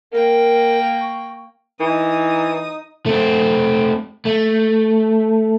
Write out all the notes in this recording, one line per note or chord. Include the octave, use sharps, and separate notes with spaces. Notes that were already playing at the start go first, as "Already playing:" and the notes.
A#3 A#4 G5
C#6
E3 D#4 D#6
A3 C4
A3